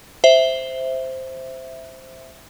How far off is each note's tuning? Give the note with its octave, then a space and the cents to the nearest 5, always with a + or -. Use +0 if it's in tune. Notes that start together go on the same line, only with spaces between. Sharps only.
C5 +0 E5 +0